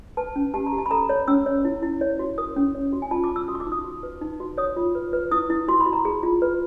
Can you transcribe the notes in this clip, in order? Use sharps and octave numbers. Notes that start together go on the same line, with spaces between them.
B4 A5
C#4
G4 A5
A#5
G4
A5
B5
A4 A#5
C#5
C#4 E6
C#5
E4
E4
C#5
F#4
A#4 D#6
C#4
C#5
F#4
G#5
F4 A5
D6
F4
E6
F#4 D#6
C#6
D6
D#4
D#6
F#4
B4
D#4
F#4
C#5 D#6
F4
B4
B4
E4 D#6
E4
F#4 C6
B5
F#4
A#5
G#4
F4
B4